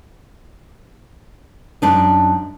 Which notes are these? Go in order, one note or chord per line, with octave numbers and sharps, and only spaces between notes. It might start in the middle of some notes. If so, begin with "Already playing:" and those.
F#2 D4 D#4